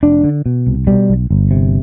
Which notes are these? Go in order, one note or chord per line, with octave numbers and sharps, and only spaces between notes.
F1 D4
D3
B2
C2
B2 G3
B1
G1
C3